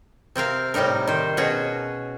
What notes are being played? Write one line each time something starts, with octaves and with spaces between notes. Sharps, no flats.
C3 C4 A#4 F5
A2 C3 G3 D#4 A#4
D#3 C5
B2 C#4 F#4 G#4